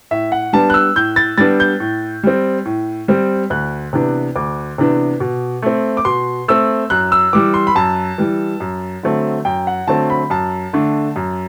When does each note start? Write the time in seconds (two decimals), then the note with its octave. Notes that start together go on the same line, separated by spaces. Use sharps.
0.11 A2 E5
0.32 F#5
0.53 G3 B3 D4 A5
0.70 F#6
0.74 E6
0.96 A2 G6
1.16 A6
1.38 G3 B3 D4 A6
1.60 G6
1.80 A2
2.24 G3 C4
2.65 A2
3.08 G3 C4
3.50 D2 F#6
3.93 C3 E3 B3 D4
4.35 D2 D6
4.78 C3 E3 B3 D4
5.20 B2
5.62 A3 C4
5.97 D6
6.05 B2 C6
6.48 A3 C4 E6
6.90 F#2 F#6
7.12 E6
7.33 E3 G3 D6
7.54 C6
7.67 B5
7.75 F#2 A5
8.18 E3 G3
8.60 F#2
9.03 D3 F#3 A3 C4
9.45 F#2 G5
9.67 F#5
9.87 D3 F#3 A3 C4 A5
10.10 B5
10.30 F#2 A5
10.73 D3 A3 D4
11.16 F#2